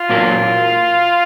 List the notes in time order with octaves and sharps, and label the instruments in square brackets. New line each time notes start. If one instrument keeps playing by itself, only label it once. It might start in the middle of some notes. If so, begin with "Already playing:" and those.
Already playing: [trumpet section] F4
[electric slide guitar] A#2 F#3 A#3